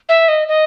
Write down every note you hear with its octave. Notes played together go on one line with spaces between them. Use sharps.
E5
D#5
D#5